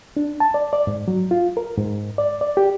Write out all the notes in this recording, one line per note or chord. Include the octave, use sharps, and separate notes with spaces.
D4
A5
D5
D5
G#2
F#3
F4
A#4
G#2
D5
D5
G4